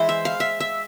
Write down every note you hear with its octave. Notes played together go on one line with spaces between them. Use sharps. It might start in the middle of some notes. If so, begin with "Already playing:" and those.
Already playing: E3 G#3 E4 C5
E5
F5
E5
E5